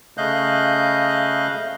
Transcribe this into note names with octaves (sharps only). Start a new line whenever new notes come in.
C#3 A3 D#5 F5 F#6 G6